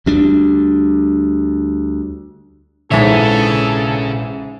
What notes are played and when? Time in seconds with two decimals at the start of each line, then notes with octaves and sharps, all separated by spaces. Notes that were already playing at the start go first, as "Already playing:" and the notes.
0.06 D2 G3 D4
2.91 A#1 G#2 C#3 E3 E4 A4 C#5 E5